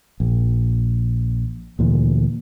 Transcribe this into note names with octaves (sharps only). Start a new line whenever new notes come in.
A#1
D2 A#2 E3